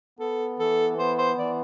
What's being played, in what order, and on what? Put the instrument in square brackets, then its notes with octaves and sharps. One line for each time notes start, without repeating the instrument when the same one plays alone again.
[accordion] B3 [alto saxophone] A4
[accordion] E3 [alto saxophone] A4
[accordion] B3 [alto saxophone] C5
[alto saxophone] C5
[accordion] E3 [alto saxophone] D5